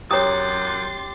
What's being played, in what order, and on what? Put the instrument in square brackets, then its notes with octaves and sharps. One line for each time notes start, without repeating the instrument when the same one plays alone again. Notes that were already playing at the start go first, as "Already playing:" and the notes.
[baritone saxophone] F#2 [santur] G4 [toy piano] C#5 A#5 D#6 [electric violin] C6 A6